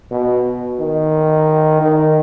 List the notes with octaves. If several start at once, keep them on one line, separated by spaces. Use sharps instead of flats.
B2
D#3
D#3